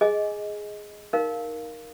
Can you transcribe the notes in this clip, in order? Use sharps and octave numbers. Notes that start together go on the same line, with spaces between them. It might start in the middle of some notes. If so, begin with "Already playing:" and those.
G#4 D#5 G#5
D#4 A#4 F5